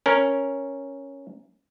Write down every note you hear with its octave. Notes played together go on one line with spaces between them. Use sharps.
C#4 A#4